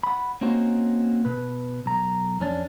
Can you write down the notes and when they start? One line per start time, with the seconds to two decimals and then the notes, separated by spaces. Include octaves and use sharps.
0.03 F#5 B5
0.41 A#3 C4 C#4 D#4 F#4 C5
1.25 B2 B4
1.86 B1 A#5
2.40 F2 C#4 D4